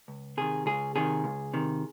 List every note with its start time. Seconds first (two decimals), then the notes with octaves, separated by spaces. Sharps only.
0.08 C#2
0.37 C3 D#3 G#4
0.66 C#2 G#4
0.95 C3 D#3 G#4
1.24 C#2
1.54 C3 D#3